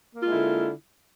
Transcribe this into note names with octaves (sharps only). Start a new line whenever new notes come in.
D3 G#3 A#3 E4 F4